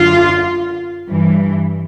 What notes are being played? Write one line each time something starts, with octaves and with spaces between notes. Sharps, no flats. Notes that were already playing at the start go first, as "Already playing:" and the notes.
Already playing: F#2 D3 F4
G2 E3